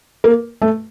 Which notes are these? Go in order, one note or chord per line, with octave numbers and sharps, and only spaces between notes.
A#3
A3